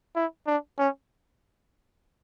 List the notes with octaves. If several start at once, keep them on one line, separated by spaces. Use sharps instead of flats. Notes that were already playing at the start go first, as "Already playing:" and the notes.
E4
D4
C#4